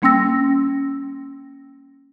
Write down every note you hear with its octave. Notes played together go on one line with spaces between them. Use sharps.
G3 A#3 C#4 G5 E6 A#6